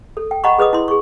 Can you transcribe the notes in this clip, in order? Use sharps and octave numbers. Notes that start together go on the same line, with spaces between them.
A4
G5
D#5 F#5 A#5 B5 C#6
G#4 B4 D#5 D#6
E4 C6
G#4 C#6